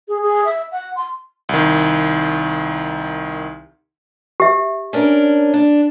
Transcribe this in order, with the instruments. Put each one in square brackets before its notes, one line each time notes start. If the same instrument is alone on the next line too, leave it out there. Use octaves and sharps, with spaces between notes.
[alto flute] G#4
G#4
E5
F#5
C6
[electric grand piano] C2 D#3
[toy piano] G4 E5
[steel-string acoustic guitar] C#4 D4 A#4
D4